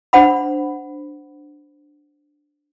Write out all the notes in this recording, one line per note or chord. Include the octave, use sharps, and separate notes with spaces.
D4 C5 F#5 B5